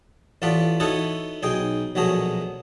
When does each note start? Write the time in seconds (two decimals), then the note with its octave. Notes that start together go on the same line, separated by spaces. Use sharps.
0.42 A1 A3 B3 F4 B4 D5
0.80 B3 D#4 E4 F#4 A4 C#5
1.43 B1 D#4 G#4 G5
1.95 A#1 B2 F#3 A3 G#4 A#5